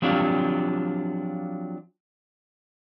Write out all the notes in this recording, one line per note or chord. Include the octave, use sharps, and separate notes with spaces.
F3 F#3 C4 D4 F4 G4